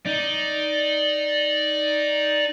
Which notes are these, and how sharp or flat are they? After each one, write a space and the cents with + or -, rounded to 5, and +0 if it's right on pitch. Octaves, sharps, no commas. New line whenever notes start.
D#4 +5 D5 +0